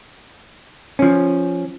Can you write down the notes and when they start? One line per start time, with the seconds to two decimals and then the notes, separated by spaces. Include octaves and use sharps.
0.99 F3 C#4